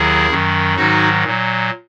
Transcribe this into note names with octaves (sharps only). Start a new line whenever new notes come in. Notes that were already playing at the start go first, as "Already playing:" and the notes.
Already playing: D#2 D#3 F#3 E4 G#4
F#2 D#3 F#3
G#2 D#3 F#3 D#4 F#4
A#2 F#3